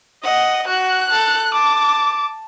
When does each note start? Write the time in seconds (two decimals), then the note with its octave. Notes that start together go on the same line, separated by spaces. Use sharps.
0.24 D#5 F#5
0.67 F#4 F#6
1.12 A4
1.54 A5 D6